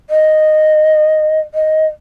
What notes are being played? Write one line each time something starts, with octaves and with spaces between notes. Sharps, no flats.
D#5
D#5